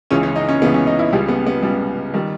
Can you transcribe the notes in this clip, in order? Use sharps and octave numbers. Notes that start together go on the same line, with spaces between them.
C#2 C#3 E3 C#4
C#4
D#4
C#4
C#2 C#3 E3 B3
C#4
D#4
E4
C#2 C#3 G3 G4
B3
B3
C#2 C#3 G3
D#3 G3